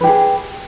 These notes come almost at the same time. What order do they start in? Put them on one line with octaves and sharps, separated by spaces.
B4 G4 G#4